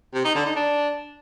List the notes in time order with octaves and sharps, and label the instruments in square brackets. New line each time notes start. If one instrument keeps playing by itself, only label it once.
[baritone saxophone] C3
D#4
D3
D#4
D4